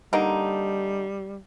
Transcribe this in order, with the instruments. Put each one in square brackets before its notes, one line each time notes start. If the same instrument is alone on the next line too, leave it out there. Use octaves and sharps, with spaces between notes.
[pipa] D3 A#3 D#4 [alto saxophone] G3